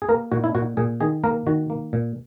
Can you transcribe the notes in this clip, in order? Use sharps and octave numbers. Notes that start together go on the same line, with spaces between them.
G#4
A#3 A#4
A#2 F#4
E4
A#2 F#4
A#2 G#4
D#3 G#4
A#3 A#4
D#3 F#4
A#3
A#2